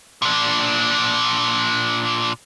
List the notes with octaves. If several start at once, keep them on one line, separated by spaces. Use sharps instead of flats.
A#2 D4